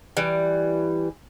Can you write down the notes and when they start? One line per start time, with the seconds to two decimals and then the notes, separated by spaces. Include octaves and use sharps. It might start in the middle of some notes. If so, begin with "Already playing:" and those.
0.17 E3 G3